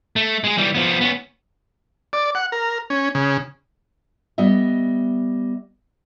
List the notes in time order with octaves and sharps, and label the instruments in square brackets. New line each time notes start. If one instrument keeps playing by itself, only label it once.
[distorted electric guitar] A3
G#3 G#4
E3 G3
F3 B3
B3 C#4
[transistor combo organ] D5
F#5
A#4
C#4
C#3
[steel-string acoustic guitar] G3 B3 D#5 E5